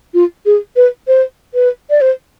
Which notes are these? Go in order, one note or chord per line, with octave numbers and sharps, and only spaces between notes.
F4
G#4
B4
C5
B4
D5
C5